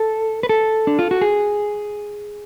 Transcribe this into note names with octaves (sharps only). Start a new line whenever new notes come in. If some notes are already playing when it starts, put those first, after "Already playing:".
Already playing: A4
B4
A4
D4
F4
F#4
G#4